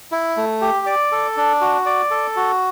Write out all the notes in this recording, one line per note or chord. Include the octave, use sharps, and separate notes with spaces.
E4
A3
G4
D5
A4
D4
F#4
D5
A4
F#4